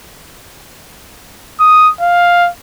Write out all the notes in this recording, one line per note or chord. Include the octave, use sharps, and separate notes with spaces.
D#6
F5